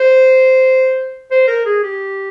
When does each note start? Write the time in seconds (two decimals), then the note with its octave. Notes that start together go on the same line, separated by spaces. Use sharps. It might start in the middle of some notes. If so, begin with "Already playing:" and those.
Already playing: C5
1.31 C5
1.48 A#4
1.66 G#4
1.83 G4